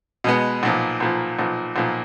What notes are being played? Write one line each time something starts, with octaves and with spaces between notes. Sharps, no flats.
B2 G#3 B3
B1 A#2 F3
B1 A#2 F3
B1 A#2 F3
B1 A#2 F3